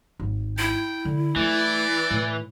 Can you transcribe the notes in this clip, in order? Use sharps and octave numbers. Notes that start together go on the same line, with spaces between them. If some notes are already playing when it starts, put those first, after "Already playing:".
G#1
E4 G5
D3
E3 A3 D5
A2